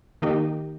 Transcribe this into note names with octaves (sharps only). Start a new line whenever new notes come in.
D#3 A#3 D#4 G4